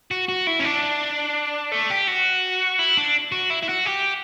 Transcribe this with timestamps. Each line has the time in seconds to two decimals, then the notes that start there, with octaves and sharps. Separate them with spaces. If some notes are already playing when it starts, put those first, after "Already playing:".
0.11 F#4
0.29 F#4
0.47 E4
0.59 C#4
0.64 D4
1.72 A3
1.90 G4
2.07 F#4
2.79 E4
2.97 D4
3.32 F#4
3.50 E4
3.63 E4
3.69 F#4
3.86 G4